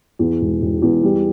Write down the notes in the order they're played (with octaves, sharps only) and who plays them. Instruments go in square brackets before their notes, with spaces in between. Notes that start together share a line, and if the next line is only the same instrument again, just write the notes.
[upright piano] E2
E1
E1
E2
G3